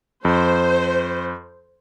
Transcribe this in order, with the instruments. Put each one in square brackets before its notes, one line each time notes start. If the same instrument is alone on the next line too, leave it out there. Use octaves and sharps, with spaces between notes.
[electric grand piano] F2 [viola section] C5